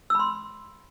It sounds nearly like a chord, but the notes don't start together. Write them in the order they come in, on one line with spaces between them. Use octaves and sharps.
E6 B5 C6